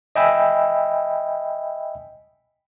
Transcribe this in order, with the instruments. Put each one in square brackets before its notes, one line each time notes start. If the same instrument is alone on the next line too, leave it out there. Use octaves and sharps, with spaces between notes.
[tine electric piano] D#5 E5 G5 G#5 B5 E6